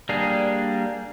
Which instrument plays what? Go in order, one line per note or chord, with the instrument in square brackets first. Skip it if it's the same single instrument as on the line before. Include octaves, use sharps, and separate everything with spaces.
[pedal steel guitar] G3 A#3 D4 G#4